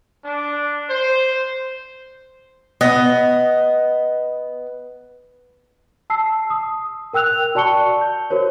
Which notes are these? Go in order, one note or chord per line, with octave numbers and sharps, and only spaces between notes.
D4
C5
B3 D#5
A5 E6 C7
D#6
A#4 G5 E6 F#6 F7
F#4 D5 A5 C#6 C#7 G7
G6
F#4 A#4 C5 C#5